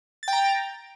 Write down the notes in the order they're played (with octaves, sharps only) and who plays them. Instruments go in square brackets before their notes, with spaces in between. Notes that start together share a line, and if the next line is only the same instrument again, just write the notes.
[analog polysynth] A6
G5
A#5